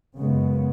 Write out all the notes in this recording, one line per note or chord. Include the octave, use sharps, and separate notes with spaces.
F#2 C#3 G#3 B3